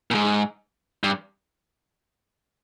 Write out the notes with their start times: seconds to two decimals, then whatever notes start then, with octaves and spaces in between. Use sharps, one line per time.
0.11 A#2
0.15 G#2
1.04 G2